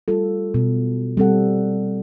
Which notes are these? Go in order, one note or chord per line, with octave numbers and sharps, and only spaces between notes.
G3 F4 A4
B2
G3 C4 A4 F#5